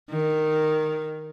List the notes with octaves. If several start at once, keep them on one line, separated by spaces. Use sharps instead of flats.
D#3